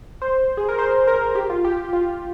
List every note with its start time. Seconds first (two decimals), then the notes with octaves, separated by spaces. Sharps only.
0.22 C5
0.57 G#4
0.69 A#4
0.79 C5
1.07 A#4
1.35 G4
1.50 F4
1.65 G4
1.78 G4
1.93 F4